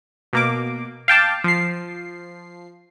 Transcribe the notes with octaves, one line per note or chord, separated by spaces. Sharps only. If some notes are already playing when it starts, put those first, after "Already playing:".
B2 A#3 D6
F5 G5 A5 D6
F3 C7